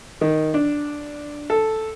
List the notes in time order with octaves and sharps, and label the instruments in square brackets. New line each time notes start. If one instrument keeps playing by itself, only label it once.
[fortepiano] D#3
D4
A4